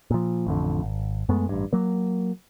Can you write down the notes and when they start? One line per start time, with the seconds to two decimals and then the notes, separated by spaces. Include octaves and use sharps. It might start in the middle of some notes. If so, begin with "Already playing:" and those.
0.11 A#2 F3
0.47 A1 F2 D3
0.83 G#1
1.29 F#2 G#3 A3 B3
1.49 A1 G2
1.73 F#3 A#3